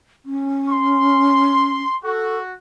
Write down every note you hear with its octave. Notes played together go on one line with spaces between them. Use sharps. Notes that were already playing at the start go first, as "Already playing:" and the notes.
C#4
C6
F#4 A4